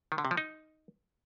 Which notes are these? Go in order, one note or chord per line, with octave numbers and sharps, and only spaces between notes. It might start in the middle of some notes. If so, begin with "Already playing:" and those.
D#3
D3
C3
F3
D#4